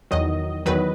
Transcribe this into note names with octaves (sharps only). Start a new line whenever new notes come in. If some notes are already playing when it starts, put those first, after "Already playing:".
E2 D#3 F#3 D#5
E2 D#3 F#3 B4